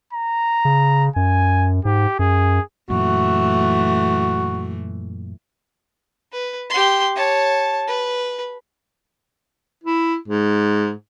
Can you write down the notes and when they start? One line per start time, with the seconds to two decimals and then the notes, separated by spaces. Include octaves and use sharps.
0.13 A#5
0.65 C#3
1.16 F#2 G#5
1.85 G#2 G4
2.19 F#2 G#4
2.90 F#2 A#2 E3 A3 F#4
6.32 B4
6.70 G4 C6
7.16 C#5 A5
7.88 B4
9.84 E4
10.28 G#2